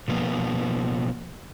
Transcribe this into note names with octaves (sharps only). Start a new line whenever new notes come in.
B2 F3 A#3 B3